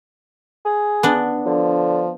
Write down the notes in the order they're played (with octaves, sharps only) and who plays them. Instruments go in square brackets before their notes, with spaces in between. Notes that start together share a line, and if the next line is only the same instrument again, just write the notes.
[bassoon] G#4
[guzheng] B3 D4
[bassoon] D3 [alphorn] F3